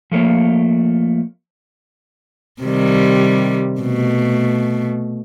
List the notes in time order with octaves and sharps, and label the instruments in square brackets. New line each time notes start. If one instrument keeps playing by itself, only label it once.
[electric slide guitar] F3 A3 A#3 C#5
[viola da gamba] C3 D#3 G3
B2 A3